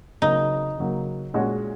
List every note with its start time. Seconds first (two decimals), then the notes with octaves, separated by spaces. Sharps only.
0.22 C#3 F#3 A#3 D#4
0.78 C#3 F#3 A#3
1.34 A#2 G#3 C#4 F#4